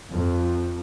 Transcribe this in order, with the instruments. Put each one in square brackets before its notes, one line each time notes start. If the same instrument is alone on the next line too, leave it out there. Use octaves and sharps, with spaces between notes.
[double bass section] F2